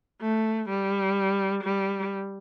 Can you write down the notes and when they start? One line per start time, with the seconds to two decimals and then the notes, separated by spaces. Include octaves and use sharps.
0.21 A3
0.69 G3
1.63 G3